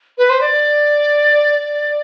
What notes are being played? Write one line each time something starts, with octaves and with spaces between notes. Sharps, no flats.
B4
C5
D5